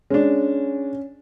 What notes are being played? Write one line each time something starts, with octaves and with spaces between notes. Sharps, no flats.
G#3 C#4 D4